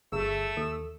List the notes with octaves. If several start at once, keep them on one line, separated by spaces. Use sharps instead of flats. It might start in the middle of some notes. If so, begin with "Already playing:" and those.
G1 A3 G#4 E6
D#2 A4